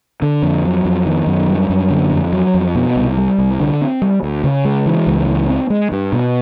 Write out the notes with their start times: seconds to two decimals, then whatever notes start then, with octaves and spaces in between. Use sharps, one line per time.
0.22 D3
0.43 F2
0.65 F#3
0.85 F2
1.06 D#3
1.27 F#2
1.48 G3
1.70 F#2
1.90 D3
2.11 F2
2.33 F#3
2.54 F2
2.75 B2
2.96 C2
3.17 G3
3.38 C2
3.60 D3
3.81 C4
4.02 G3
4.23 D2
4.44 C#3
4.65 G#3
4.86 E3
5.07 C#2
5.28 E3
5.50 C4
5.70 G#3
5.92 G2
6.13 B2